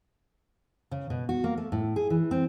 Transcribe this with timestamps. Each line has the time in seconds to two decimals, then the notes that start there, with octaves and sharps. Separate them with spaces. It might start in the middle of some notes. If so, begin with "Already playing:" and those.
0.91 C#3
1.10 B2
1.29 F#4
1.44 A#3
1.57 A3
1.72 A2
1.96 G#4
2.10 E3
2.31 C4